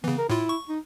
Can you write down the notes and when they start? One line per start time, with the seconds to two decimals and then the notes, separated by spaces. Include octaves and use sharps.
0.04 C#3 E3 B3
0.18 A#4
0.30 A2 E4 F4
0.49 C#6
0.69 D#4